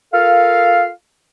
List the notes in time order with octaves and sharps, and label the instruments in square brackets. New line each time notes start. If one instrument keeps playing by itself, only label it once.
[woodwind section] F4 A4 A#4 F5